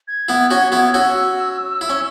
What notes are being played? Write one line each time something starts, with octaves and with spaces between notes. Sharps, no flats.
G#6
B3 E4
C#4 F#4
B3 E4
C#4 F#4 E6
E4
C#4